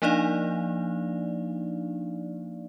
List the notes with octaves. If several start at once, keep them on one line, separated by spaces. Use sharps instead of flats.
F3 A#3 D4 D#4 D5 F5